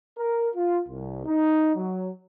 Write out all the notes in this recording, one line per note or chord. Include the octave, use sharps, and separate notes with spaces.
A#4
F4
C2
D#4
F#3